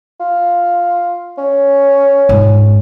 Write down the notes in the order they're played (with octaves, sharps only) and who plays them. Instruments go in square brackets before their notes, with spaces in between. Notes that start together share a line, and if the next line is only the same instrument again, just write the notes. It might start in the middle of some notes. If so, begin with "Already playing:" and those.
[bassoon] F4
C#4
[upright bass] G#2